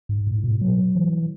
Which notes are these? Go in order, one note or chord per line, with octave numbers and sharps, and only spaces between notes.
G#2
A2
B2
F#3
E3